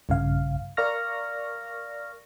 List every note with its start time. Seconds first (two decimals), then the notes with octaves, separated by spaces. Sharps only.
0.09 A#1 G2 C#3 F5
0.77 A#4 D5 F5 C#6 F6 A#6